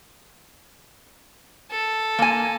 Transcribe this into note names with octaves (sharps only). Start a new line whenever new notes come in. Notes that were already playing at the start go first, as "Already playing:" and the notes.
A4
A#3 G#5